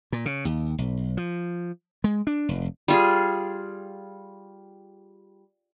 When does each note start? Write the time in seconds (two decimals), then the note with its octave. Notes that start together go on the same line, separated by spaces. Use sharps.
0.12 A#2
0.26 C#3
0.45 D#2
0.78 B1
1.17 F3
2.04 G#3
2.27 D4
2.49 F1
2.88 G3 F4 G#4